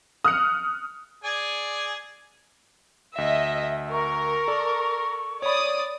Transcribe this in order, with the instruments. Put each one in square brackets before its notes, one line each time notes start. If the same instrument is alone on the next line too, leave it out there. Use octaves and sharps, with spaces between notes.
[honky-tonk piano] D#6 F6 F#6 C#7
[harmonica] G#4 D5 G#5
[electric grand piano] D2 [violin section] D#5 E5
[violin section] A#4 [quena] C#6
[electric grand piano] A4 D5
[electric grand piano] C#5 B5 [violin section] D5 D#6